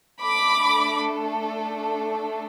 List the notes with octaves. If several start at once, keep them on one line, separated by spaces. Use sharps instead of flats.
A3 D4 A4 B5 D6